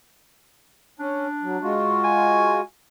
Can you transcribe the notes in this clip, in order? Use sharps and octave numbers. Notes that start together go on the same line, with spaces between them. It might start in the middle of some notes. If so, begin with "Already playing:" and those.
C#4 D4
F#3
G#3 F4 F#4
G#5